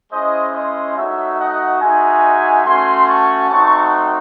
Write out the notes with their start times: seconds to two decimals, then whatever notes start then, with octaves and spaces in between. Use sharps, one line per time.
0.12 G#3 C#4 E4 C5 D#5
0.55 C5 D#5
0.97 A3 D#4 F#4 C#5 E5
1.39 D#5 F#5
1.81 G#3 D#4 F#4 E5 G#5
2.66 A3 C#4 F#4 G#5 C6
3.08 A5 C#6
3.50 A3 C4 D#4 F#4 A5 C#6